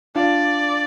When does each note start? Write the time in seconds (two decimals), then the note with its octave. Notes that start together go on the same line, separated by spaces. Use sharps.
0.15 D4 F4 D5